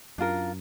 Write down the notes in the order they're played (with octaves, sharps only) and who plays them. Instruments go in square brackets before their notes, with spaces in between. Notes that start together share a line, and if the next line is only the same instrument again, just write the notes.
[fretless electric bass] F#2 [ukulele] D4 F4 A#4